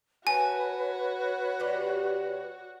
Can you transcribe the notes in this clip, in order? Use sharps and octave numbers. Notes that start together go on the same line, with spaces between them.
F#4 A#4 B4 C#5 G#5 A5
A#2 G3 G4